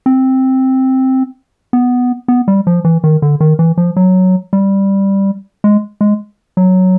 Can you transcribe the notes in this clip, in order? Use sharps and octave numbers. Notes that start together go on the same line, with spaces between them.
C4
B3
B3
G3
F3
E3
D#3
D3
D#3
E3
F3
F#3
G3
G#3
G#3
F#3